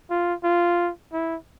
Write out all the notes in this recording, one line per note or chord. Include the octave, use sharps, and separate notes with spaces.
F4
F4
E4